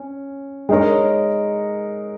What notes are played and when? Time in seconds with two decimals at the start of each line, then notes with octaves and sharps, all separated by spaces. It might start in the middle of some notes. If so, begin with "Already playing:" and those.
Already playing: C#4
0.69 G#3 D#4 A#4 C#5